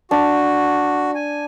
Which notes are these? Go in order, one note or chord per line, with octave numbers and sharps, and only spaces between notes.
D4 F#4
G#5